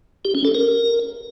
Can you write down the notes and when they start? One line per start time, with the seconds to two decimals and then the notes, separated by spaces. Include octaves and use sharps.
0.25 G4
0.35 C#4
0.45 A4
0.55 A#4